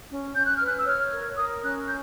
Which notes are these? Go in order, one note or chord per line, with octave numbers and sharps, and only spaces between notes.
C#4
C#4 G6
F#6
F6
B4
F#6
E6
C#5 F6
A#4
A#4 D#6
C#4 F#6
G6